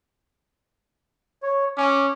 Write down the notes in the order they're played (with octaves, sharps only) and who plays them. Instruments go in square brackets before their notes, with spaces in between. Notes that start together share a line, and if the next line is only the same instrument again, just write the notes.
[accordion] C#5
[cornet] C#4 [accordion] D6